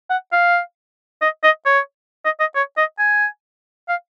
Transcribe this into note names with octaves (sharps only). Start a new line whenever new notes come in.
F#5
F5
D#5
D#5
C#5
D#5
D#5
C#5
D#5
G#5
F5